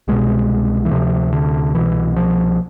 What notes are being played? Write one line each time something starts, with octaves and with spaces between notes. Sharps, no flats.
C2 B2 G#3
E3
D2 C3 F3
D3
C2 B2 E3
F3